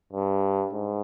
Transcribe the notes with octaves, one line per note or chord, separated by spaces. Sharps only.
G2
G#2